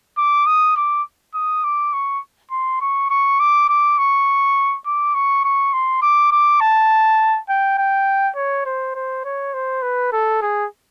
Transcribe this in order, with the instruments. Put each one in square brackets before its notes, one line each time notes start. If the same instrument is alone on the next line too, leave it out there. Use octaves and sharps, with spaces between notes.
[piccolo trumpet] D6
D#6
D6
D#6
D6
C#6
C6
C#6
C#6
D6
D6
C#6
D6
C#6
C#6
C6
D6
D6
A5
G5
G5
C#5
C5
C5
C#5
C5
B4
A4
G#4